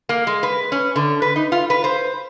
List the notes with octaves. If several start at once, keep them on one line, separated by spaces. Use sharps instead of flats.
A#3
G#3
B4
C#4
D3
B4
D#4
F4
B4
C5